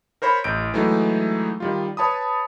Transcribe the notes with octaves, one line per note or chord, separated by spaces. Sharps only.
A#4 C5 C#5 B5
A1 G6 D7
E3 F#3 G#3 A3 D#4
D#3 G3 F4
B4 C#5 A5 B5 D#6